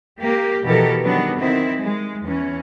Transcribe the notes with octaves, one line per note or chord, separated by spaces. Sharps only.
A#3 G4
B2 E3 F3 G4 A4 A#4
D#3 F#3 G3 B3 D4
D#3 C4 E4
G#3
E2 E3 C#4